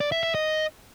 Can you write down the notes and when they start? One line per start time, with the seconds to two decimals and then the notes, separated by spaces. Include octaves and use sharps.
0.01 D5
0.12 E5
0.23 E5
0.35 D#5